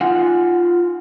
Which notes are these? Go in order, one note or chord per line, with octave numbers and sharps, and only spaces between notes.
D#4 F4 F#5 G#5